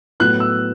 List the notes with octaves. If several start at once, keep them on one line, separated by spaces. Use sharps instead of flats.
A2 F#3 B3 F#6
E6